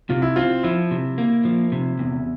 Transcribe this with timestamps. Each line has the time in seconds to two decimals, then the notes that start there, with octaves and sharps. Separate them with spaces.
0.10 C3 F4
0.22 E4
0.36 C4 F4
0.63 F3 E4
0.91 C3
1.18 A#3
1.45 F3
1.72 C3
1.99 E2